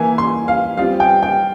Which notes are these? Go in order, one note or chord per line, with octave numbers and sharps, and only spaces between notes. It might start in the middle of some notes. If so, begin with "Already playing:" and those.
Already playing: E3 A#3 E4 G#5
C6
F5
G3 C4 F4 F5
G5
G5